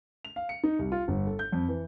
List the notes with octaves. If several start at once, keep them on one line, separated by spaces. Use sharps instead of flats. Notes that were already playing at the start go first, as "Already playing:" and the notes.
F7
F5
C#7
D#4
C2
F4
G1
A4
G6
F2
E3